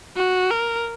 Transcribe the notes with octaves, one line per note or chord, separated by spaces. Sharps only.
F#4
A#4